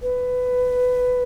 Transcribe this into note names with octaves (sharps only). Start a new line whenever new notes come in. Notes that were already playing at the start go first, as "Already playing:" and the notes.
B4